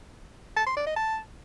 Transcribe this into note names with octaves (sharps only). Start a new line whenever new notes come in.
A5
C6
D5
D#5
A5